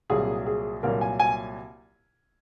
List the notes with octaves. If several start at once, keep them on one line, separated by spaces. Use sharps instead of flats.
C2 A#2 F#3 G#4
G#4
C2 A#2 F#3 A#4
G#5
G#5